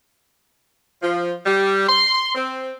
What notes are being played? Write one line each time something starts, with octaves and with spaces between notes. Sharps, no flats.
F3
G3
C6
C4